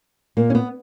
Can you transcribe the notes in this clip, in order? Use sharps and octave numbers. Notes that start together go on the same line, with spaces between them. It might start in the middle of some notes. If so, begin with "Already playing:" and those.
A#2 A#3
C#4
B3